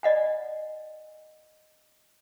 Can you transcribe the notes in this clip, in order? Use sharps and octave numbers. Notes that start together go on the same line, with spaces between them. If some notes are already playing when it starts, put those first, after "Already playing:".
D5 D#5 F#5 G#5